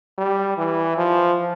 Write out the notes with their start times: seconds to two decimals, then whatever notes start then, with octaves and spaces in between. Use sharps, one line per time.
0.18 G3
0.58 E3
0.98 F3